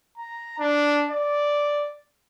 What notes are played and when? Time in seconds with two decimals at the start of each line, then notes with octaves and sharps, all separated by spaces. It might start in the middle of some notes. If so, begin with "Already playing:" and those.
0.17 A#5
0.59 D4
1.11 D5